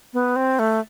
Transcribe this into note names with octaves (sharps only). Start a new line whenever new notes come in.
B3
C4
A3